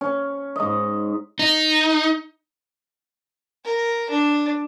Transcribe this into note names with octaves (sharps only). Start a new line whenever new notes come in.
C#4
G#2 D#5
D#4
A#4
D4